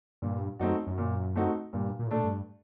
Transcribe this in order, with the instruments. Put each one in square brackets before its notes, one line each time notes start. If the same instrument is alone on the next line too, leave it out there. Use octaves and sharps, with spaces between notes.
[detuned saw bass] G2 [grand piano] A#2
[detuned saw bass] F#2 [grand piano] A3 C4 D#4 F#4
[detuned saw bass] F#2
[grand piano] A#2
A3 C4 D#4 F#4
[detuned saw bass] G2 [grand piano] A#2
[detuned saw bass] A#2
A2
[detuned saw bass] A#2 [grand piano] A3 D4 A4
[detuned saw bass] G2